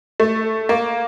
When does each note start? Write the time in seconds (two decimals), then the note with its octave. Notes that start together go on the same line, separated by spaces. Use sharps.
0.20 A3
0.69 A#3